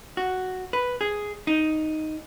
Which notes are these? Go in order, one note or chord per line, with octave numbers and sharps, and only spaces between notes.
F#4
B4
G#4
D#4